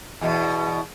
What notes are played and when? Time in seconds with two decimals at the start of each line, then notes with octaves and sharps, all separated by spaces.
0.21 E2 B2